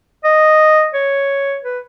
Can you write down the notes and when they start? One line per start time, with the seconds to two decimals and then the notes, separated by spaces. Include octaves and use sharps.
0.24 D#5
0.94 C#5
1.64 B4